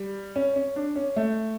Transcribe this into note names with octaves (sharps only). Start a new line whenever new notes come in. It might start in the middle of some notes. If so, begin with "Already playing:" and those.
Already playing: G3
C#4
C#4
D4
C#4
A3